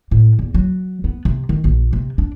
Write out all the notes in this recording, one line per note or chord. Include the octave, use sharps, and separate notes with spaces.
A2
E2
F#3
B3
C3
D#3
A#1
C3
D4